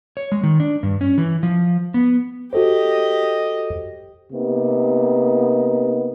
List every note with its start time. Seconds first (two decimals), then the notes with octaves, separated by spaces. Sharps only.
0.17 C#5
0.32 G#3
0.43 D#3
0.60 D4
0.83 G2
1.01 C#4
1.18 E3
1.43 F3
1.94 B3
2.53 F#4 G4 A4 C5 D#5
4.32 C3 A#3 B3 D#4